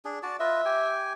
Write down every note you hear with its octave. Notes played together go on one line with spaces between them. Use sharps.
D4 G#4
F#4 D5 A5
F4 B4 D#5 E5
G4 G5 G#5